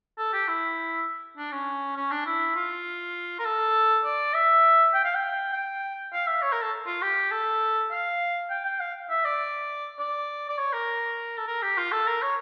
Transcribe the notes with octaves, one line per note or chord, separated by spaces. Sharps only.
A4
G4
E4
D4
C#4
C#4
D4
E4
F4
A#4
A4
D5
E5
G5
F5
G5
G5
F5
E5
C#5
A#4
A4
F4
G4
A4
F5
G5
G5
F5
E5
D5
D5
D5
C#5
A#4
A4
A#4
G4
F4
A4
A#4
C#5